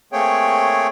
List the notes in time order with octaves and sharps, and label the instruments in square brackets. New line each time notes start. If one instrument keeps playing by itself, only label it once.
[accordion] A3 A#3 C4 G#4 C#5 G5